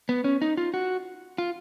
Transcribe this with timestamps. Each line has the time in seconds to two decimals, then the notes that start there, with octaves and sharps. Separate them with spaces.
0.09 B3
0.24 C#4
0.42 D#4
0.57 F4
0.74 F#4
1.38 F4